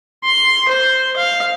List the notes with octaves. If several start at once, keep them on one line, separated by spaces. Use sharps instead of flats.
C6
C5
F5